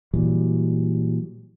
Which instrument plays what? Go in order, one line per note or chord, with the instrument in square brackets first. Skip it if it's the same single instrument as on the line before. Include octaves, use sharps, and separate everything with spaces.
[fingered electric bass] A#2 E3 F#3 G3